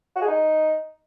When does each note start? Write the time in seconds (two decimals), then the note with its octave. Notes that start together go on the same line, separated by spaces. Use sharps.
0.15 F#4
0.22 G#4
0.28 D#4